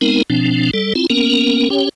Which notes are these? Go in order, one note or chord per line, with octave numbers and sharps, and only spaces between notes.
G#3 B3 C4 D#4 A#4
B2 F3 C4 D4
G3 A4
C4 E4 F4
A#3 B3 C#4 A#4
C#4 G4 C#5 G5